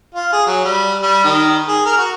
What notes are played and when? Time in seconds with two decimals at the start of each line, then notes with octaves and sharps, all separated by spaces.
0.15 F4
0.32 G#4
0.47 F#3
0.65 G3
1.03 G3
1.24 D#3
1.69 G#4
1.85 A#4
1.98 F#4